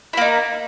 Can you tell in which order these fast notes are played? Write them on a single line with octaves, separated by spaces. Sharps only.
E4 A#3 D#4